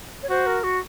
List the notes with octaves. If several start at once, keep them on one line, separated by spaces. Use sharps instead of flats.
C#5
F#4 C5
A#4
F#4